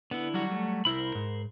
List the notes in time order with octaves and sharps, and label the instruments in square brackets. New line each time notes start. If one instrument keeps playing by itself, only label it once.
[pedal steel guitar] D3 E4 [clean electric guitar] B3
[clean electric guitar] F#3 G3 F#4
[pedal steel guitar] A3
[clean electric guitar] C2 E4 [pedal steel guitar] A#4 C5 B5
[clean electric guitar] G#2